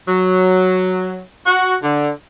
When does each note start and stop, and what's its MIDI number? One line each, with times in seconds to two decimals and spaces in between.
0.08 1.22 54
1.46 1.75 66
1.82 2.10 50